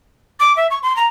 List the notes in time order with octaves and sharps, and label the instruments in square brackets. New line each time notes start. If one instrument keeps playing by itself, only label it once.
[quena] D6
E5
C#6
C6
A#5